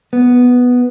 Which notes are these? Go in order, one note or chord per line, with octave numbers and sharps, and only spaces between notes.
B3